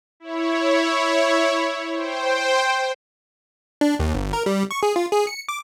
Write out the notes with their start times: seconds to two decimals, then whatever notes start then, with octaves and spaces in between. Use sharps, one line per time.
0.20 E4 C#5
1.94 C5 G5
3.81 D4
3.99 D#2
4.15 G1
4.33 A#4
4.46 G3
4.71 C#6
4.83 G#4
4.96 F4
5.12 G#4
5.27 C#7
5.49 D6